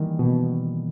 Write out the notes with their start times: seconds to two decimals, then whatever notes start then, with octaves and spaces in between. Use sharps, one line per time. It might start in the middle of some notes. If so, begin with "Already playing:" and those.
Already playing: D#3 E3 G3 A#3
0.19 B2